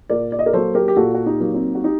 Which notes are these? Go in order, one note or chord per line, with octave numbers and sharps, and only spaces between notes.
A#2 A#4 D5
D5
D#5
A#4 D5
F#3 A#3 A4 C5
G4 A#4
G4
A#2 F#4 A4
F#4
D#4 G4
F#3 A#3
C4 D#4
F#4
D#4 G4